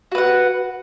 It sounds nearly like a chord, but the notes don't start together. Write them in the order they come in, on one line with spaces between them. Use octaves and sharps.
F#4 B4 F#5